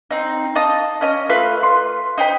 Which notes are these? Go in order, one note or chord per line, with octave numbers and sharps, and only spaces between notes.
C4 D#4
D#5 F5 A5 D#6
C#4 D#5 F6
A3 F4 B4 E6
C6
D#4 C5 G5 B5